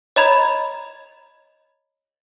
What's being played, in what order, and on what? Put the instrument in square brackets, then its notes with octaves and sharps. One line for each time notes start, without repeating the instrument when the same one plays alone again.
[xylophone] C#5 D#5 A#5 B5 G#6